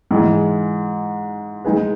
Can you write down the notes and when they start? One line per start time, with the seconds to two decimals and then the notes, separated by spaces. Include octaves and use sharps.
0.11 G#2 E3 G#3
1.65 G#3 D#4 G#4 B4